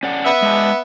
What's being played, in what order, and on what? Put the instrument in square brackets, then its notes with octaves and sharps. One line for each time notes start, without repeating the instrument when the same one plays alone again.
[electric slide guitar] C#4 D5 F#5
[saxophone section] B3 E5
[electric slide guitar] G#3 D4